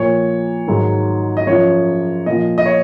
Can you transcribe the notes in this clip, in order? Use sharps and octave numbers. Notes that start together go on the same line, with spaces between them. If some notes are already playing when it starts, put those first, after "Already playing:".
Already playing: A#2 F3 C#5
G#2 D#3 F#3
D#5
F#2 F3 C#5
A#2 F3 D#5
D#5
C#5